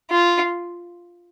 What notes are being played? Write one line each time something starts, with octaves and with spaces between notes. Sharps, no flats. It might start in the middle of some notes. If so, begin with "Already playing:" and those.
F4